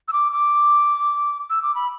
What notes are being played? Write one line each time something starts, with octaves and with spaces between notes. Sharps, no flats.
E6
D6
D6
E6
D6
B5